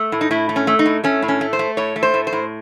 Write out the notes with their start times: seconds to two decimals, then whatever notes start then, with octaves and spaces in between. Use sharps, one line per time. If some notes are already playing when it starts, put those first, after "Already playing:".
Already playing: A3
0.12 A2
0.21 D#4
0.31 A2 E4
0.49 A3
0.56 C#4
0.67 A3
0.79 D#4
0.86 A2
1.04 A3 C#4
1.22 A2
1.28 C#4
1.41 A3
1.53 C5
1.59 A3
1.77 A2 C#5
1.96 A3
2.03 C5
2.14 A2
2.27 C5
2.33 A2